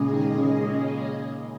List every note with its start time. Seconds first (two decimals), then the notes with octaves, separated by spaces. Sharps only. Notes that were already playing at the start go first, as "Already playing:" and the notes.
Already playing: A#2 C#3 G#3 C#4 G#4 D#5
0.13 D#3
0.35 C#3